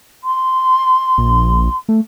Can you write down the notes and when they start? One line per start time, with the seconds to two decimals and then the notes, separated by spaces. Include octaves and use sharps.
0.24 C6
1.18 A#1
1.89 A3